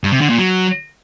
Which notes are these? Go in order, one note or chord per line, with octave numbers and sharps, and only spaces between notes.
G2
C3
D3
A#2
F#3